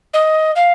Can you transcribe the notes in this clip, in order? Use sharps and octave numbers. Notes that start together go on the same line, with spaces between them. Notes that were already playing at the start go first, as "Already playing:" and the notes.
D#5
F5